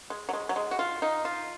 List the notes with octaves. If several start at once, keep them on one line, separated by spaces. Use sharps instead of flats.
G#3
F#3
G#3
F#3
G#3
F#4
F4
D#4
F4